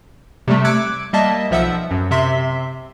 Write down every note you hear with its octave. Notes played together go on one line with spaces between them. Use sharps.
C3 G3 A3
D6 E6 F#6 G#6 C#7 D7
G3 A#3 D#5 E5 A5 A6
B1 F3 E5 F#5 E6
F#2
C3 E5 C6 B6